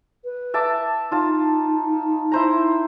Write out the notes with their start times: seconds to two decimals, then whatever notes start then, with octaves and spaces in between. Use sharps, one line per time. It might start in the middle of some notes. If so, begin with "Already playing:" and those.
0.25 B4
0.54 E5 A5 D6
1.12 D#4 F4 A5
2.32 E4 C5 A#5